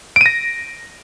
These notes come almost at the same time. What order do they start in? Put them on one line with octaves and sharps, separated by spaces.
D7 D#7 A#6